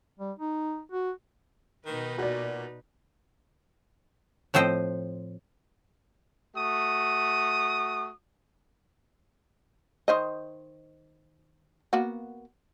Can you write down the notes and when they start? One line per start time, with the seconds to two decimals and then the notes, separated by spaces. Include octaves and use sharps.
0.20 G3
0.39 D#4
0.92 F#4
1.86 B2 D#3 D#4 B4
2.18 A#2 F#4 D5
4.54 A2 F3 C4 C5 D#5 G5
6.56 A3 F#4 D#6
10.08 D#3 C5 D#5
11.93 A#3 B3 F#4